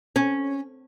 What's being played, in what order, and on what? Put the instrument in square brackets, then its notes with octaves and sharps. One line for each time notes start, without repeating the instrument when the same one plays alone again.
[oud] C#4